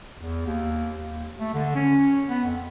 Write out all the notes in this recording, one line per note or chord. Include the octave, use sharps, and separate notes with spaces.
E2
D#2
D#2
A3
D3
C#4
B3
F2